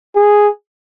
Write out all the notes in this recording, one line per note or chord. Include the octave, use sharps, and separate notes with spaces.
G#4